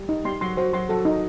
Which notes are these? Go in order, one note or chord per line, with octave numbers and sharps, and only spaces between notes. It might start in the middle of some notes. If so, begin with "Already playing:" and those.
Already playing: G3
D#4
G3 G4 C6
F#3 F#4 C6
F#3 F#4 C5
F#3 F#4 C6
F#3 F#4 A4
D#4